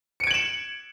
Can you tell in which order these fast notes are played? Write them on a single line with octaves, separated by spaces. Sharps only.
C#7 D7 G#6 F#7 E7